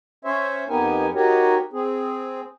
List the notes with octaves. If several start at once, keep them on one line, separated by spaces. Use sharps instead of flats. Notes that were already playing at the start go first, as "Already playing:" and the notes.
C#4 C5 C#5 E5
F2 B3 D#4 G4 A#4 G#5
D#4 F#4 G4 A#4 C#5
C4 G#4